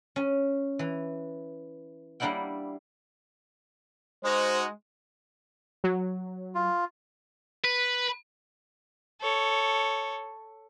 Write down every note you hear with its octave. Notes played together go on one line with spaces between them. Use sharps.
C#4
E3
G3 A#3 D4 E4 F#5 G5
G#3 D#4 F#4 C5
F#3
F4
B4
A4 C#5